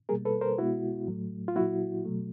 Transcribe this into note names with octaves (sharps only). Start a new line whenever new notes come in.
B2 G3 A#3 G#4 A#4
A4 B4
A#4 C5
B2 G#3 B3 E4 F#4
A2 F#3 A3
F4
A#2 F#3 A#3 E4 F#4
B2 F#3 A3